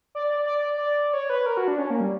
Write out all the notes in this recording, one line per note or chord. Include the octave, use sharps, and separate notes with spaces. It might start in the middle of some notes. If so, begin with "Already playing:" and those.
D5
D5
D5
D5
D5
C#5
B4
A#4
F#4
D4
C#4
A#3
G3